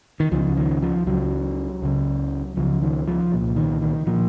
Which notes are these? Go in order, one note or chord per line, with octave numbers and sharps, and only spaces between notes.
D#3
C#2 C#3 F3
D#3
F3
C#2 C#3 F#3
C#2 C#3
C#2 C#3 F3
D#3
F3
C2 A#2
D#3
D#3
A#2 F3